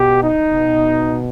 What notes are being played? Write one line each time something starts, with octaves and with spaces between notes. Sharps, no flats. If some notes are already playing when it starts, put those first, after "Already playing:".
Already playing: B2 G4
D#4
B2